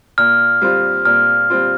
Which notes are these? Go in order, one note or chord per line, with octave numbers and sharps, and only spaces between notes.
A#2 F6
G3 C4 F4
A#2 F6
G3 C4 F4